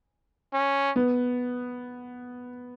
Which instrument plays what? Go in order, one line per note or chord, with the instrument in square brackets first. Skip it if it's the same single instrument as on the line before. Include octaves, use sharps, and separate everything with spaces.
[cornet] C#4
[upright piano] B3